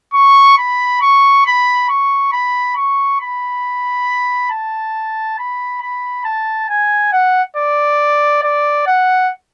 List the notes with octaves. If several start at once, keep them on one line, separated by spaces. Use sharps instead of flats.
C#6
B5
C#6
B5
C#6
B5
C#6
B5
A5
B5
B5
A5
G#5
F#5
D5
D5
F#5